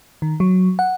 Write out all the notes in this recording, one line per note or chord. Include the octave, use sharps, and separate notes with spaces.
D#3
F#3
F#5